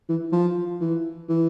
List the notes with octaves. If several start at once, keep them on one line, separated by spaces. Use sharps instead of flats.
E3
F3
E3
E3